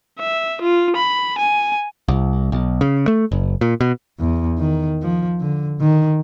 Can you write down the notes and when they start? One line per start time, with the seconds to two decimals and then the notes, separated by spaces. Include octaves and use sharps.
0.20 E5
0.62 F4
0.96 B5
1.39 G#5
2.08 C2
2.52 B1
2.81 C#3
3.08 A3
3.32 F#1
3.61 A#2
3.81 B2
4.19 E2
4.59 D#3
5.02 F3
5.40 D3
5.81 D#3